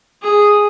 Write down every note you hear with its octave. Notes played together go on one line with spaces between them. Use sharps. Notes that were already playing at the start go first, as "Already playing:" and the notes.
G#4